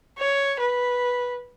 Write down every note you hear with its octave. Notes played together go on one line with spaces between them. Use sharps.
C#5
B4